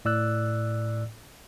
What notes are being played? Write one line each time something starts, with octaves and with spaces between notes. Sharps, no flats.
A2 D5 E6 F#6